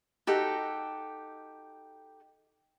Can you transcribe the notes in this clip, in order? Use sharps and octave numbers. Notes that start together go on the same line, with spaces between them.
D#4 F#4 G4 A4